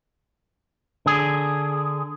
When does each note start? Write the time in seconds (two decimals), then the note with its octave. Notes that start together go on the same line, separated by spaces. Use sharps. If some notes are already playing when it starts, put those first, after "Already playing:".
1.06 D3 G#4